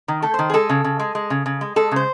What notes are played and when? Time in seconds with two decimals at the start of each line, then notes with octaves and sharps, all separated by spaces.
0.08 D#3
0.22 A3 A4
0.34 D#3 C5
0.50 G#4
0.54 G#3 A4
0.70 C#3
0.84 C#3
1.00 G#3
1.15 G#3
1.30 C#3
1.46 C#3
1.61 G#3
1.76 G#3 A4
1.91 C#3 C5